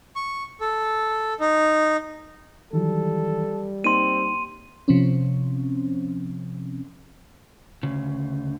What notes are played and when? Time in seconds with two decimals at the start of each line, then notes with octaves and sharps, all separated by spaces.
0.16 C#6
0.61 A4
1.40 D#4
2.73 D#3 E3 F#3 G3 A4
3.84 A#3 C4 D#4 C6 D#7
4.88 C3 F3 C4 C#4
7.83 D2 C#3